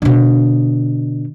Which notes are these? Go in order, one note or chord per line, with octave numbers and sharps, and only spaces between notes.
B2 D3